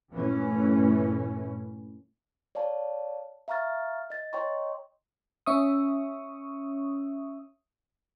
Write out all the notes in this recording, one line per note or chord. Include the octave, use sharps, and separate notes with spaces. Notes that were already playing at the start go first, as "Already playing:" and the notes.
G2 A#2 E3 A3 C#4
C#5 D5 F5 A5
E5 F5 A#5 C#6 F6 A6
D#5 A6
C#5 D#5 G5 A#5 C6 C#6
C#4 E5 C#6 D#6